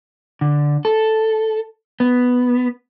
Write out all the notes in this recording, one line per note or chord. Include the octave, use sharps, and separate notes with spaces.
D3
A4
B3